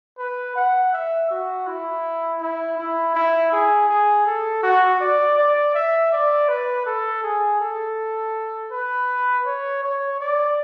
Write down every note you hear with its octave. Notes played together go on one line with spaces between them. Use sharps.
B4
F#5
E5
F#4
E4
E4
E4
E4
G#4
G#4
A4
F#4
D5
D5
E5
D5
B4
A4
G#4
A4
B4
C#5
C#5
D5